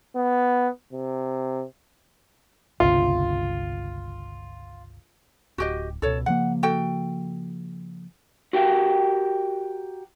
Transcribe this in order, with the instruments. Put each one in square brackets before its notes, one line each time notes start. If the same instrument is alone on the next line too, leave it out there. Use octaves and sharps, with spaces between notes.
[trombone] B3
C3
[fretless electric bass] G1 C#2 C3 [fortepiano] F4
[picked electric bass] D1 [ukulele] F#4 G4 D#5
[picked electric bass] C#2 B2 [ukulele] A4 C#5
[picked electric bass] C#3 F3 A#3 [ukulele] F#5
[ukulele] F#4 A4 G5
[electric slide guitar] F#4 G4 A#4 G5